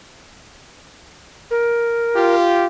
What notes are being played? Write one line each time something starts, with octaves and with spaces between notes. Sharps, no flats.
A#4
F4 G4